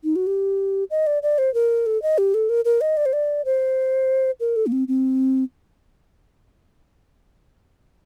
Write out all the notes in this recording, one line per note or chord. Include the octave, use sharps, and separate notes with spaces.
D#4
F#4
G4
D#5
D5
D5
C5
A#4
A4
D#5
G4
A4
A#4
A#4
D#5
D5
C5
D5
C5
A#4
A4
A#3
C4
C4